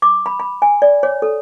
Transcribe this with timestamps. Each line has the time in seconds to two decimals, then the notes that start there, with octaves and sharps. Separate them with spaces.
0.02 D6
0.26 B5
0.40 B5
0.62 G#5
0.82 D5
1.03 C#5
1.22 A4